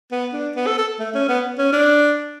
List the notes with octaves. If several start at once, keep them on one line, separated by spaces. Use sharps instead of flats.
B3
D4
B3
A4
A4
A3
C#4
B3
C#4
D4